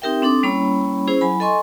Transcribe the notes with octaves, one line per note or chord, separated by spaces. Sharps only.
C4 D#4 G4 A#4 E5 G5
C4 D4 A4 D6 D#6
G3 A#3 C#4 E4 C#5 B5
C#4 E4 G#4 C5
F#3 E4 G#5 B5
A4 D#5 G#5 C6 C#6